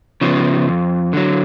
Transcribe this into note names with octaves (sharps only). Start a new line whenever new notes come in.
C#3 F3 B3
F2
D3 F#3